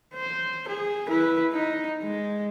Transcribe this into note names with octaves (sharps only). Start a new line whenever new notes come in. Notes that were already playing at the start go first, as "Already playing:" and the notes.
C5
G#4
E4 B4
D#4
G#3